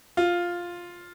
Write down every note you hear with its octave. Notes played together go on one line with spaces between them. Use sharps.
F4